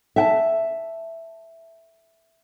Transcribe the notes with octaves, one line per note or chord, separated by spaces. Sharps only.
E5 G5 A5